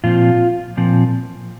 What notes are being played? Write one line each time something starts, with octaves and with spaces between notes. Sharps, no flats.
A#2 F3 C4 F4
A#2 F3 C4